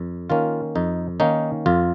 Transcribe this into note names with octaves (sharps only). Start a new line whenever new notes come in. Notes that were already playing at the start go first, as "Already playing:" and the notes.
Already playing: F2
D#3 A#3 C#4 F4
F2 D#4
D#3 A#3 C#4 D#4
F2 F4